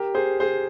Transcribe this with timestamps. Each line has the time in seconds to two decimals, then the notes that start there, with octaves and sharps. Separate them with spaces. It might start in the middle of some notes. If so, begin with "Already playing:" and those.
Already playing: G4 A#4
0.15 G#4 C5
0.40 G#4 C5